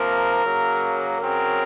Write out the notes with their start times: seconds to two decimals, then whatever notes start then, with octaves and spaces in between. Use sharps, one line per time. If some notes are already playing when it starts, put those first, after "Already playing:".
Already playing: C3 F3 A#3 A#4
0.43 C#3 F#3 A#3
1.19 C#3 F#3 C4 A#4